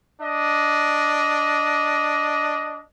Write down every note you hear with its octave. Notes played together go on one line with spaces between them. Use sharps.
D4 D#5